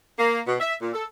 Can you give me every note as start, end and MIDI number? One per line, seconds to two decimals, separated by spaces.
0.18 0.41 58
0.46 0.55 47
0.60 0.75 76
0.80 0.92 46
0.94 1.04 69